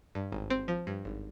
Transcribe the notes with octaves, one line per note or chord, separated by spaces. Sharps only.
G2
G#1
C4
F3
G2
G#1